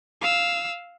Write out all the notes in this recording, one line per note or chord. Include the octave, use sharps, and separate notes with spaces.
F5 E6